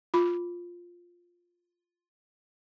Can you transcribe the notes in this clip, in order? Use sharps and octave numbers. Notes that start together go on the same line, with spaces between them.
F4 B5